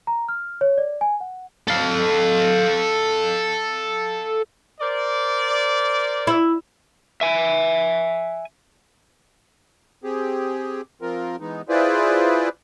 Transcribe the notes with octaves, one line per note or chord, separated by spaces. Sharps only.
A#5
F6
C#5
D5
G#5
F#5
A4 F5
A#4 C5 D5
E4
E5 G#5
C4 G4 G#4
F3 C4 F4 A#4
E3 G#3 B3 D#4
E4 F4 G#4 B4 C5 D5